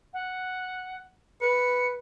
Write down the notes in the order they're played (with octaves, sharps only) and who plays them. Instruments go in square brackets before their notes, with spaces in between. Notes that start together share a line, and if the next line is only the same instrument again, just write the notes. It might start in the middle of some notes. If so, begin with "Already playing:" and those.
[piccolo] F#5
[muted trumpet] B4 [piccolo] C#7